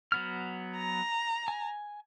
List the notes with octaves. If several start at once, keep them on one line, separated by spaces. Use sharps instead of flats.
F#3 B3 F6
A#5
G#5